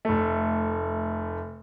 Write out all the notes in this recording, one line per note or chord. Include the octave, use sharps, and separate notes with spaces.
F1 A3